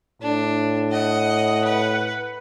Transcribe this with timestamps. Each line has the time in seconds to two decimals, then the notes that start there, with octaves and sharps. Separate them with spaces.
0.22 A2 D4
0.92 D#5 F#5
1.65 B4